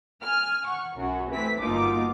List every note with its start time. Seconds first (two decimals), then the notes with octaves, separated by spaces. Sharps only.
0.21 G#5 F6
0.65 F#5 C#6
0.95 B1 F#2 F#4
1.30 E3 A3 C4 B4 B6
1.61 G1 B2 A#3 D#4 F4 D6